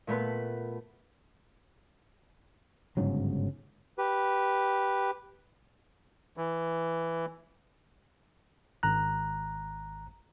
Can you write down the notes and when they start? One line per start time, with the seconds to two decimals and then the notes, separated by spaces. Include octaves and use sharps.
0.07 A#2 A3 B3 B4
2.97 G1 G#2 C#3 F#3
3.98 G4 B4
6.37 E3
8.83 G#1 A#5 F#6